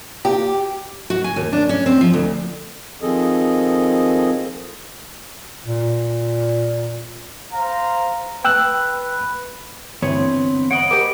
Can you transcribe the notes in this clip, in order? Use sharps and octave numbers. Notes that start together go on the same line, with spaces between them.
G4
F#4
G#5
D#2
D4
C#4
C4
F3
D2
D#3 F3 C4 G#4 A4 D#5
A#2
C5 F5 A#5
B4 G5 E6 F#6
G2 D3 E3 B3 C4 C#5
C#5 D#5 F#5 B5 D7
G4 A#4 C5 D6